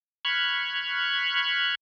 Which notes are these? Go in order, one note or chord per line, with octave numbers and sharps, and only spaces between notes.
B5 C#6 F6 F#6 G#6